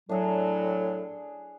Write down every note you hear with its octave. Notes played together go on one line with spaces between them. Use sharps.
A2 F#3 D4 G#4